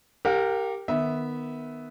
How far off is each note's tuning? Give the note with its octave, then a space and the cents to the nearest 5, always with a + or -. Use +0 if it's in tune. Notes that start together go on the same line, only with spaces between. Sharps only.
G4 +0 A#4 -15 F5 +45
D#3 -20 B3 +0 E5 -15